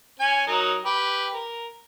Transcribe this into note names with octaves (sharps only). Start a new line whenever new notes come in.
C#4 G#5
F#3 D#4 A#4
G4 B4
A#4